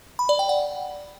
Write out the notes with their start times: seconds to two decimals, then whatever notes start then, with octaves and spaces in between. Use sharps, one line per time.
0.19 B5
0.29 D5
0.39 G5
0.49 F#5